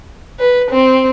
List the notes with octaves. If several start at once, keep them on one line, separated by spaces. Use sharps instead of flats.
B4
C4